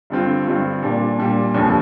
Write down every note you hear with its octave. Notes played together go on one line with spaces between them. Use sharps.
G2 D3 G3 C4 F4
G2 D3 G3 C4 F4
A#2 G3 D4
A#2 G3 D4
F1 D#2 D3 F3